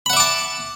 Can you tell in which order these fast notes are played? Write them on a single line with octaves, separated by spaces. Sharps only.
B5 F#5 E5 D6 A5